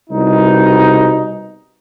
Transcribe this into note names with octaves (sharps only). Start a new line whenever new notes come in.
C2 B2 D#4